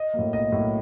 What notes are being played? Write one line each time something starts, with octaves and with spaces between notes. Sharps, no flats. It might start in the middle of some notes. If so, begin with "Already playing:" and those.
Already playing: D#5
A2 F#3 A#3
B1 D#5
A2 F#3 A#3